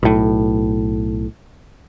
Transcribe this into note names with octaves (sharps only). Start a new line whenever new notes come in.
B1 A2